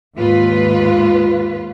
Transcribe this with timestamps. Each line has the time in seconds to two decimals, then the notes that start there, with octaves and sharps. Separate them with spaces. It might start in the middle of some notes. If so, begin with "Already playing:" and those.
0.17 D#2 G#2 F4 B4